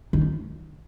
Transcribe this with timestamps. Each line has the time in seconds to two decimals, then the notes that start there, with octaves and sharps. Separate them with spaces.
0.13 D#3